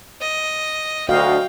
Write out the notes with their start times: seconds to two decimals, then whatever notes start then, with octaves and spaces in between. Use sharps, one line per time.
0.21 D#5
1.09 D2 F#4 D#5 F5 G5